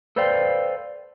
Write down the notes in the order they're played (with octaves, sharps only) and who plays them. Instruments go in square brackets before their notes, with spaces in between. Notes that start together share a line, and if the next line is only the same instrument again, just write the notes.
[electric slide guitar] A4 B4 C5 D5 F5 G5